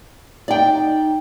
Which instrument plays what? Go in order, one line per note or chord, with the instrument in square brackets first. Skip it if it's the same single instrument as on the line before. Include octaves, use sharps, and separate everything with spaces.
[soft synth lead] D#4 [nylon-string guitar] D5 G5